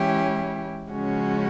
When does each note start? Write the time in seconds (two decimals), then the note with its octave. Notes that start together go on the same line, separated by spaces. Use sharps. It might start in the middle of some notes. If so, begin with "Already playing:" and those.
Already playing: E3 G#3 C#4 E4 G4
0.91 C#3 F3 G#3 C#4 F#4